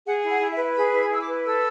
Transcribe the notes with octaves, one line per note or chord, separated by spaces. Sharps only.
G#4 F#5
E4
F#5
E4
E5
B4
G#4 B5
E4
B5
E4 E6
D6
B4
A4 E6